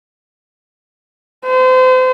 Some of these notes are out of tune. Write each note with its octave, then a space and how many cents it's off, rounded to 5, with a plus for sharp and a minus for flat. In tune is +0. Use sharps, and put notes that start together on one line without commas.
C5 -35